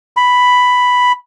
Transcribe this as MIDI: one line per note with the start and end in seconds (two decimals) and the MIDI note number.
0.17 1.12 83